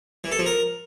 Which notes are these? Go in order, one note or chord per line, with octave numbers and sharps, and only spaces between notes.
E3
A4
F3
A#4